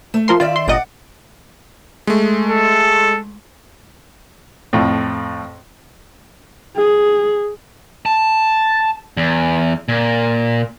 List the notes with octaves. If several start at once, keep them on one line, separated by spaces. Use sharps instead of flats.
A3
F3 A#4 C6
D#3 F4 D5 E5
C6
G1 A#2 D5 D#5 F#5
G#3 A3
A4
F2 A2
G#4
A5
E2
A#2